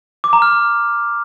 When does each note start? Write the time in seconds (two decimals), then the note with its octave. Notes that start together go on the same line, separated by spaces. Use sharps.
0.24 D6
0.33 A#5
0.42 F6